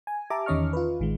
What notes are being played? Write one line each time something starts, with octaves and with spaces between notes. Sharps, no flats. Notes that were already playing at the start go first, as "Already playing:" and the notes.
G#5
G4 E5 A5 A#5 D6
E2 D#3 C#4 D#5 C#6 F6
F4 B4
A1 D#3 G#3